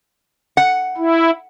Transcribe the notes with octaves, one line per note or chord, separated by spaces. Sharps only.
F#5
E4